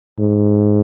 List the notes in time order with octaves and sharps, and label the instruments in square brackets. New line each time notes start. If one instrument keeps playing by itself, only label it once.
[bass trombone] G#2